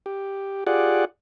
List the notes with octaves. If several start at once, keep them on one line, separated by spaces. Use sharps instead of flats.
G4
F4 G4 G#4 D5 F#5